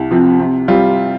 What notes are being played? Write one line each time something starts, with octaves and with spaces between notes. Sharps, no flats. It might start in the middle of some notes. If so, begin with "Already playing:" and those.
Already playing: C2
C3 F3 C4
C3
G3 C4 F4